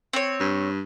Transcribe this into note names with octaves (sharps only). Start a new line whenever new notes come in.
C4 C#5
G2